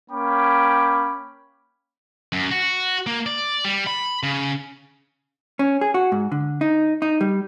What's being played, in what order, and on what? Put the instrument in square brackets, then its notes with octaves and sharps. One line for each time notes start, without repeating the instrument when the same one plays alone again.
[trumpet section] A#3 C#4 G5 B5 D6
[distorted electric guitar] F#2
F#4
A#3
D5
G3
B5
C#3
[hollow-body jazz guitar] C#4
G#4
F#4
G#2
D3
D#4
D#4
G3